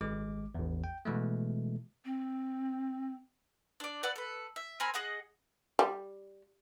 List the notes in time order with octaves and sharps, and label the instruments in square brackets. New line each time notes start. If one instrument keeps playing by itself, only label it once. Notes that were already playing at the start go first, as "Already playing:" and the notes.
[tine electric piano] G#1 G#3 D6
A1 E2
G5
B2 E3 G#3 A3
[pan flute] C4
[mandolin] D4 D5
B4 D5 F#5 E6
A4 B4
E5
C4 A#4 G#5 B5
G#4 D#5 F#5 F#6
[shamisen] G3